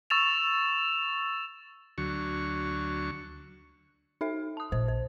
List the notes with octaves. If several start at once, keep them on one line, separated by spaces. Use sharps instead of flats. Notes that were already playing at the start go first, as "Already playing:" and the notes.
C#6 E6 A6 E7 F7
D2 F#3 C#6
D#4 A4 E5
A5 D#6
A#1 C5
C5